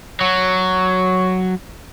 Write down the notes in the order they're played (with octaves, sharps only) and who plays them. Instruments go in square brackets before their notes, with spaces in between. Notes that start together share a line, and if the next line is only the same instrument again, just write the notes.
[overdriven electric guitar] F#3 [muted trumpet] C#5